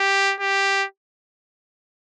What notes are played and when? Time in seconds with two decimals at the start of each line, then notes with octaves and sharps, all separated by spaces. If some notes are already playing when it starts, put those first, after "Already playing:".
Already playing: G4
0.40 G4